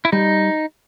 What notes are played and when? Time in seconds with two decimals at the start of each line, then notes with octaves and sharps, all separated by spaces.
0.05 E4
0.12 G3 D#4